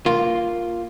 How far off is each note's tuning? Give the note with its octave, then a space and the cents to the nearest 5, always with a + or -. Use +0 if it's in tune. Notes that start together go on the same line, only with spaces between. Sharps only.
A#3 +0 F4 +0